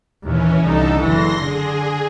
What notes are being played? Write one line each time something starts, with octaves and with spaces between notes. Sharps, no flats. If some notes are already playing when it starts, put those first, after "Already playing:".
D#2 A#2 E3 C#4
C2 D3 D#4 A4
F#1 E3 C6 A#6
D3 G#4